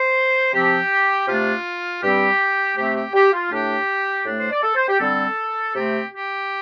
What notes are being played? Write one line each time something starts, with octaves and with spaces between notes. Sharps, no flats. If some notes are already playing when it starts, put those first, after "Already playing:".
Already playing: C5
C3 F3 C4 G4
C3 A3 D4 F4
G2 G3 C4 G4
C3 A3 C4 G4
G4
G4
F4
A2 A3 D4 G4
A2 A3 D4
C5
D5
A4
C5
G4
D3 G3 C4 A4
C3 A3 C4 G4
G4